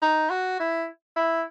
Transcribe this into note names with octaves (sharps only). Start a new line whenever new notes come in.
D#4
F#4
E4
E4